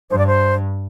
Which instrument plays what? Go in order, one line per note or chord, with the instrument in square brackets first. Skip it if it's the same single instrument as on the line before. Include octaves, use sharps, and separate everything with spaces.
[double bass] G2 [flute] C5
[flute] D5
C5